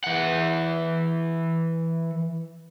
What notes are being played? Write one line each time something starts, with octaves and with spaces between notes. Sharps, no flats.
E3 F#5